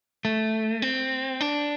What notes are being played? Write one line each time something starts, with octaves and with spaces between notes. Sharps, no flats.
A3
C4
D4